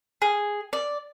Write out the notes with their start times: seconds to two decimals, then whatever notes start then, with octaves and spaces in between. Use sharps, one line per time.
0.22 G#4
0.73 D5